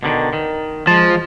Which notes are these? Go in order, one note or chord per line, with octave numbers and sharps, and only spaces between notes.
B2 D3 D#3
D#3
F3 G#3 A5